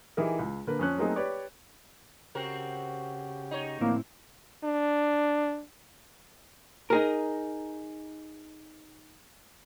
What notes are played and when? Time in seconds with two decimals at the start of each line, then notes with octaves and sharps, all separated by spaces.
0.17 E3 D#4 E4 G4 G#4 A#4
0.39 C#2
0.67 D3 A#3 A#4 B4
0.79 F2 C#4 F#6
0.98 F#3 A3 A#3 C4 D#4 G#4
1.16 G4 B4 C#5 D5
2.35 C#3 C4 F#4 G4 A#4
3.51 D#4 C#5
3.81 A2 D3 E3 F3 A#3 C4 E4
4.64 D4
6.90 D#4 G#4 A#4